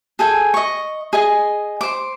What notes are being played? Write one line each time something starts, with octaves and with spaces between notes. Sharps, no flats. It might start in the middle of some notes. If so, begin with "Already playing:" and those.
G#4 A4 G5 G#5
D#5 C#6
G#4 D#5 G#5
C5 D6